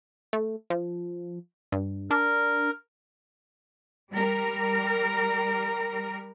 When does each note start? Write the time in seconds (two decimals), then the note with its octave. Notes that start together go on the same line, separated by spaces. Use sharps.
0.33 A3
0.70 F3
1.72 G2
2.11 D4 A#4
4.13 G3 A#4